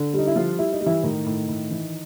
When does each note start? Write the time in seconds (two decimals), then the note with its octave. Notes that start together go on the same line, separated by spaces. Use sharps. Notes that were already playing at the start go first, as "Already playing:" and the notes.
Already playing: D3
0.13 G3 D#4
0.27 E4
0.36 F3 G3 F4
0.59 G3 E4
0.73 D#4
0.81 G3
0.86 E3 E4
1.03 A2 D#3 D#4
1.26 A2
1.48 A2
1.71 E3